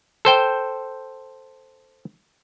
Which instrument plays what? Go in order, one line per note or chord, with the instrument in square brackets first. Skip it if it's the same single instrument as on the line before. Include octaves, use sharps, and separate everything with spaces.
[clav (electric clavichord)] A4 C5 G5